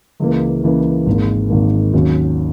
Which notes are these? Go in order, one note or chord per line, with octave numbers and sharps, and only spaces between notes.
C#2 C#3 E3 A#3
C#2 C#3 E3 A#3
G#1 G#2 D#3 A#3
G#1 G#2 D#3 A#3
D#2 D#3 F#3 C#4